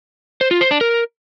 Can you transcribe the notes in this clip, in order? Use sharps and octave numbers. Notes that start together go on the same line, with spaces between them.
C5
F4
C5
D4
A#4